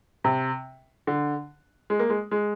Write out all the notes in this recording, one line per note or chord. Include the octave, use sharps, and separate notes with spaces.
C3
D3
G#3
A#3
G#3
G#3